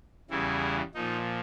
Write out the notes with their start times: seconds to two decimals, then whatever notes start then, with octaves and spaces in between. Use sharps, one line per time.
0.30 E2 C#3 E3 G3 E4
0.95 A#2 F3 D#4